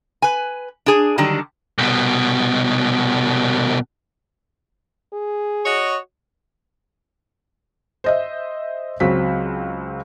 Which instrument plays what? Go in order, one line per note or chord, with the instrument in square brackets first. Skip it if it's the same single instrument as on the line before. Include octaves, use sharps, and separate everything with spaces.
[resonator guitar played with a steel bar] B4 G#5
D4 G#4
D3 D#3 F#3 G3 D4
[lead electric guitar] C2 B2
[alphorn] G#4
[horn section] F#4 C#5 D#5
[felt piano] C5 D#5 E5
C#2 F#3 C4 B6